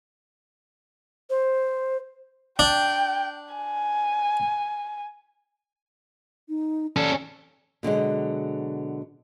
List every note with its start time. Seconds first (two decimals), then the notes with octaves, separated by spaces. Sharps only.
1.30 C5
2.59 D4 G5
3.55 G#5
6.49 D#4
6.96 C#4 A4 D5
7.83 B2 D3 F#3 G#3